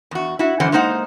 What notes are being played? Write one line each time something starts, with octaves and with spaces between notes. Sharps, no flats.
E2 F#4
E4 F#4
F#2 D3 E3 C5 F#5
G#3 A#3 D#4 C5 F#5